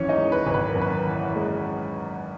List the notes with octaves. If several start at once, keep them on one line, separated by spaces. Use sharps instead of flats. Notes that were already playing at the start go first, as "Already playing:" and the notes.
Already playing: G#1 F#2 E3 C#4 C#5
D#4 D#5
G#3
B4
G#1
B4
A#4
F#2
B4
E3
G#3